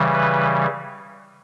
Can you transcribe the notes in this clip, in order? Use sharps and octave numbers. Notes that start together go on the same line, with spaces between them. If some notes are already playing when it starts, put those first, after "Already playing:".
Already playing: C#3 E3 G3
B4